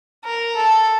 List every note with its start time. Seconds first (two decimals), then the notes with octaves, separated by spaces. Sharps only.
0.25 A#4
0.56 A4